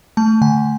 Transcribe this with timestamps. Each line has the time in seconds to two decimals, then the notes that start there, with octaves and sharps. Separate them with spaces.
0.17 A3 A5
0.42 D3 G#5